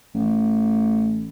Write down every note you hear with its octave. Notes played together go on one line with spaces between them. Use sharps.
A1